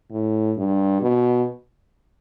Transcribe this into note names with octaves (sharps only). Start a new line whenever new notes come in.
A2
G2
B2